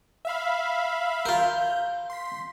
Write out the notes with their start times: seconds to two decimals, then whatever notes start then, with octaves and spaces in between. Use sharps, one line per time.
0.25 E5 F5 B5
1.26 F4 A#4 G6
2.10 C6 B6